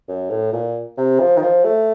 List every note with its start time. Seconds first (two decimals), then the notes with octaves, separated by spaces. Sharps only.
0.09 F#2
0.30 A2
0.53 A#2
0.97 C3
1.20 F3
1.37 D#3
1.42 F3
1.64 A3